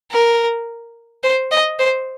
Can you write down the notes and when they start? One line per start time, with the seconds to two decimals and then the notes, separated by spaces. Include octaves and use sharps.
0.11 A#4
1.23 C5
1.51 D#5
1.79 C5